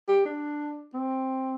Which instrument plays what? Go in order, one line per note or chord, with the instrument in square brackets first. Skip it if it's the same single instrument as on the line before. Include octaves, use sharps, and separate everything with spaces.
[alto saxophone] G4
D4
C4